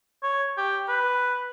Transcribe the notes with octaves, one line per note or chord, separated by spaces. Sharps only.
C#5
G4
B4